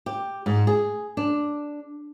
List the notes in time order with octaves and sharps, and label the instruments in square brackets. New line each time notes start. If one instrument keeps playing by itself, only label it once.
[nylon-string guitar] G4
G#2
G#4
D4